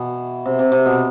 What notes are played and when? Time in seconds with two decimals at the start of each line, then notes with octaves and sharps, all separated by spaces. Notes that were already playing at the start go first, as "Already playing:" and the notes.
Already playing: B2 E3
0.46 C3
0.59 C3
0.72 C3
0.86 B2